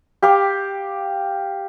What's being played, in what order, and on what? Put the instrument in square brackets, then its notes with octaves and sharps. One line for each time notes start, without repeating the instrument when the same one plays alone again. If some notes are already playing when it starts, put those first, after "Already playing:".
[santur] G4 F5 D6